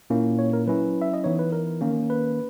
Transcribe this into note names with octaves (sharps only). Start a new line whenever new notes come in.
A#2 A#3 C#4 E4
C#5
A#4
F#3 C#4 E4 B4
E5
D#5
E3 B3 D#4 C#5
B4
A#4
D#3 A#3 C#4
B4